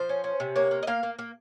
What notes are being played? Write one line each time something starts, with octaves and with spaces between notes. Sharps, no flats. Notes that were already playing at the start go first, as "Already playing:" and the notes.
Already playing: F3 C5
C#4
C#4
C3
A#3 C#5
A#3
D#5
A#3 F5
A#3
A#3